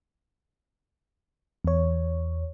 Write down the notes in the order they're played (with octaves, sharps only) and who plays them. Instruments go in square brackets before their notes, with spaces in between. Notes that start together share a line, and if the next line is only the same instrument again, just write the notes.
[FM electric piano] E2 C#5